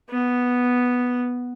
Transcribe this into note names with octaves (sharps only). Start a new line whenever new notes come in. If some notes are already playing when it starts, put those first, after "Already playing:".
B3